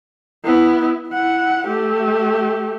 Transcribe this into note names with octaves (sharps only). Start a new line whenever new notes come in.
B3 E4
E4 F#5
A3 G4